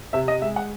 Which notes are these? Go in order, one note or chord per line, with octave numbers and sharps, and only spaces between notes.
C3 E5
D#5
G#3 E5
F#5